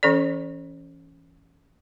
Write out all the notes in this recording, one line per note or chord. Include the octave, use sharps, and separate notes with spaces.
E3 C#4 A4 D5